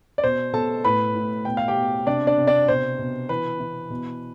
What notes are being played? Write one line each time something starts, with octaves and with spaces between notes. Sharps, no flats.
D5
B2 C5
B2 A4 A5
A2 B4 B5
A2
B2 G5
F5
G4 G5
B2
C3 D4 D5
D4 D5
C3
D4 D5
B2 C5
B2
E3 B4
E3
B2